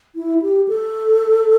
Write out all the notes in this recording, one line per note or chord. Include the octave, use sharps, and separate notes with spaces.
E4
G4
A4